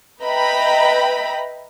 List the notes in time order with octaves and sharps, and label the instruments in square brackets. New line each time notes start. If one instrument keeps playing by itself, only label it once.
[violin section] B4 D#5 E5 G5 A#5 B5